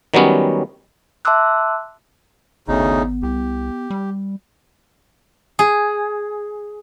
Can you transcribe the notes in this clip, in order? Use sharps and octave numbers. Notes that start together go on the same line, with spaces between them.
D#3 F#3 G3 B3 C#4
E5 A5 C6 D6 E6 F#6
G#1 D2 C#3 B3 D#4
C2 G4
G3
G#4